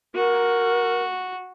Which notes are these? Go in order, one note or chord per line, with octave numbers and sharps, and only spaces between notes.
F#4 A#4